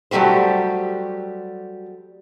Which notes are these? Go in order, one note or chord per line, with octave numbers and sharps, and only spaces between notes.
F#3 G3 A3 G4 C5